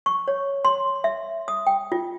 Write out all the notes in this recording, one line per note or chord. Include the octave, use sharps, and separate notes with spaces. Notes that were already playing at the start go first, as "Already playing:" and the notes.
C#6
C#5
C6
E5
D#6
G5
F4